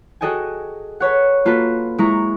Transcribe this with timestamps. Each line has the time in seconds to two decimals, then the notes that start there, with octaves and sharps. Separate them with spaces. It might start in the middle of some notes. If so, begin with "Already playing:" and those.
0.21 F#4 G#4 A4 D#5 G5 G#5
1.00 A4 B4 C#5 F#5
1.45 A#3 F4 F#4 A4 B4
1.98 G#3 E4 A#5 C#6